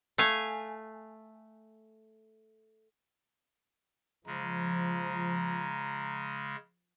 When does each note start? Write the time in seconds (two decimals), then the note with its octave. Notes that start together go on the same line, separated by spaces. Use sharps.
0.18 A3 F5 G#5
4.27 C#3 F3 G#3 A#5